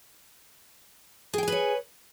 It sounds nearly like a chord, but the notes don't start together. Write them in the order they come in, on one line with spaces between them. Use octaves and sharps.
G#4 G5 G#5 B4 C#5